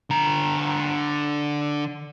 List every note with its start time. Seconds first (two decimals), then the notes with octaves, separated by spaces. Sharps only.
0.10 D3 A#5